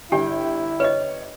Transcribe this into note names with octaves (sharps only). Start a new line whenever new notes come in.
G1 E4 G4 G5
B4 C#5 D#5